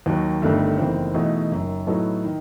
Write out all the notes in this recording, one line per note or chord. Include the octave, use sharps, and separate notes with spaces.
D#2 D#3 F#3
G1 G2 D#3 A3
F#1 E2 D#3 A3 C4
E2 B2 A3 D#4 F#4
F#1 F#2 D#3
A2 F#3 B3 D#4 A4
D#3